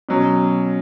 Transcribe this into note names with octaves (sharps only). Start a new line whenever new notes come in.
B2 F#3 C#4